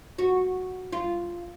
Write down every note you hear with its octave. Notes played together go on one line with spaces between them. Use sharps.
F#4
F4